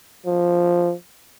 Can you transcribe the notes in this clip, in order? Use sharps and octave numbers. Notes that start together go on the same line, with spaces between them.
F3